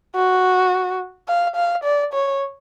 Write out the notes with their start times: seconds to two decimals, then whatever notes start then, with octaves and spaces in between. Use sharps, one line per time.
0.15 F#4
1.28 F5
1.56 F5
1.84 D5
2.13 C#5